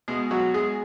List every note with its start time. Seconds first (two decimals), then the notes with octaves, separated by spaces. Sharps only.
0.08 B2 G#3 G#4
0.31 F#3 F#4
0.54 G#3 G#4